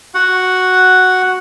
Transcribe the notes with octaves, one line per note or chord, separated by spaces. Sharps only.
F#4 F#5